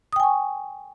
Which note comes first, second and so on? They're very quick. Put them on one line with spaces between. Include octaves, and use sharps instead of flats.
D#6 G5 G#5 C#6